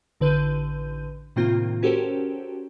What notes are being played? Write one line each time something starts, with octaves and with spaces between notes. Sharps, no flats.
A1 D3 B4 G6 D#7
A2 C3 D#3 A#3 C4 F4
C#4 F#4 G4 A4 A#4 C5